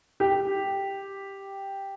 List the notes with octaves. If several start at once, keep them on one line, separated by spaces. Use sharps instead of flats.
G4